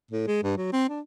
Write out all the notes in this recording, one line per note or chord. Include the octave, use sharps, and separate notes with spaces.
A2
G#3
G2
F#3
C4
D4